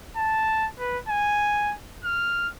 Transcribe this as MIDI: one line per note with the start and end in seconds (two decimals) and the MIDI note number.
0.17 0.67 81
0.80 0.98 71
1.09 1.75 80
2.05 2.48 89